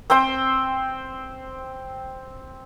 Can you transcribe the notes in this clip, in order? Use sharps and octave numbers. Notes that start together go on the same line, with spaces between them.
C4 C5 G5 C6